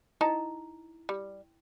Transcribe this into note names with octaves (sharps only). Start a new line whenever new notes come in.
D#4 E4 A5
G3